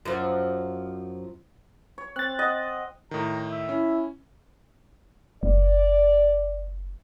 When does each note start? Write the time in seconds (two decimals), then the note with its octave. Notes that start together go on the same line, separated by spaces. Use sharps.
0.05 F#2 F3
1.98 C#5
2.16 C4 F#6 A6
2.39 D#5 F#5
3.11 A2 D#3 A#5
3.52 E5
3.69 C#4 E4
5.43 F#1 D5